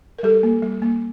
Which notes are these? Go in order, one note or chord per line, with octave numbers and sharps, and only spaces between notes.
A#4
G3 G4 A4
A#3
G3
A#3